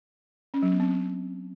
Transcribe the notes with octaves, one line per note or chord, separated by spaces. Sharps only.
C#4
F#3
B3
C4